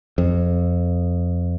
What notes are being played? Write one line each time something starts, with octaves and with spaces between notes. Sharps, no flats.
F2